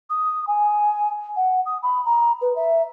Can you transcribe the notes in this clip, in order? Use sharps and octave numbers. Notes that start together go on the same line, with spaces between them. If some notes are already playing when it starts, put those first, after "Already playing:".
D#6
G#5
F#5
D#6
B5
A#5
B4
E5